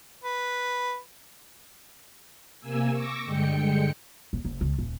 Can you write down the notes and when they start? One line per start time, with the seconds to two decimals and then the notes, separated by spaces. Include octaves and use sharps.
0.24 B4
2.60 C3 A#3 G#5 E6
2.91 C#6 D6 E6 A#6
3.25 G2 D3 G#3 G5 C#7
4.33 D#1
4.45 F#1
4.61 C#2
4.78 D#1